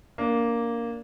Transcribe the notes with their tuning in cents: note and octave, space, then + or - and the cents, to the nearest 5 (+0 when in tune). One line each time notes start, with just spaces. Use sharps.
A#3 +0 D4 -25